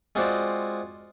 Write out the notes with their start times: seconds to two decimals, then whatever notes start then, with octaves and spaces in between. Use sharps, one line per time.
0.15 G#3 C4 F4 F#4 C5 D5